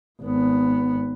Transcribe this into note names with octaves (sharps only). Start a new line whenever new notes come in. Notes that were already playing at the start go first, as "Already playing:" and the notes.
G#1 B3